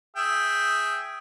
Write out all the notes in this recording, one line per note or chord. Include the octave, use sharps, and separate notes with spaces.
G#4 E5 G5